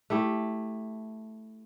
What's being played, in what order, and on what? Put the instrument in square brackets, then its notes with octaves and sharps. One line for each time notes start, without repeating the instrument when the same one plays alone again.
[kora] A3 E4 G4